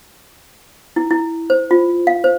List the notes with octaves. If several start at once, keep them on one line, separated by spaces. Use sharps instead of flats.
E4
E4
C5
F4
F5
C5